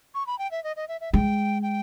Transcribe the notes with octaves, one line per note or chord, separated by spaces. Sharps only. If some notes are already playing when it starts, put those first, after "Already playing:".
C#6
B5
G5
E5
D#5
D#5
E5
E5
G#3 G5
G5